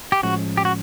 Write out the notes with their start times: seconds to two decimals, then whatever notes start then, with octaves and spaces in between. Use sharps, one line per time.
0.12 G4
0.23 A2 F3 G#3 C#4 F#4
0.57 G4
0.65 F#4